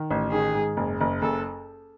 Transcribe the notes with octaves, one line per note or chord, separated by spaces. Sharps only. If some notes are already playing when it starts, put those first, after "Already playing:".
Already playing: D#3
A1
D#3 G#4
G#2
F#1
F#1
F#1 A4